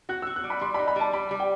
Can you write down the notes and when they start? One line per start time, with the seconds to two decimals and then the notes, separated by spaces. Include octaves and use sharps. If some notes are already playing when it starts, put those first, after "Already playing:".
0.09 F#4 F#6
0.22 F#4 E6
0.36 F#6
0.44 G3
0.50 B5
0.61 G3 C6
0.74 B5
0.79 D#4
0.88 B5
0.96 G3 A5
1.13 G3 B5
1.31 G3
1.40 G5